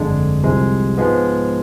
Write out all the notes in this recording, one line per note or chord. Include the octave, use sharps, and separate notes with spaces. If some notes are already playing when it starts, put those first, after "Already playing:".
Already playing: G1 F2 D3 G#3 D4
C2 C3 F3 G#3
G#2 F3 G#3 B3